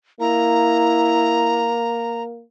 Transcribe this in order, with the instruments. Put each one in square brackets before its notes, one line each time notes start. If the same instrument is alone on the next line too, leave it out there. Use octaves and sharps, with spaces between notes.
[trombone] A#3 [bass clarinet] E4 [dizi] A#5